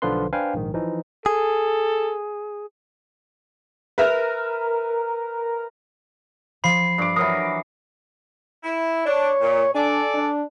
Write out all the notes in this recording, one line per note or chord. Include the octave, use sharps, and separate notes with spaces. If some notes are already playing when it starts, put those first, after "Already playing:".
B1 D3 F3 F4 B4 C6
D4 B4 C5 F5 G5 G#5
A#1 G#2 D#3
E3 F3 D#4
G#4 A4
A#4 B4 E5 F6
F3 B5 C7
G2 D6
E3 F#3 A#4 D#6
E4
D4 C#5
A#2
D4 G#4 A4 D5
D4